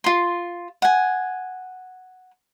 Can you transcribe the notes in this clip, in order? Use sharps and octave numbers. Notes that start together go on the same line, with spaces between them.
F4 C6
F#5 G#5